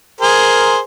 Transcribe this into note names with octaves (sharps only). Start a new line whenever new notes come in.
G#4 A#4 C5